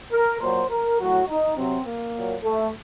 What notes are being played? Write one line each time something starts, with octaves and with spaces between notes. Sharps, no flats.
A#4
A#2 F#3 C5
A#4
A2 F#3 F#4
D#4
C3 F#3 C4
A#3
A#2 F#3
A3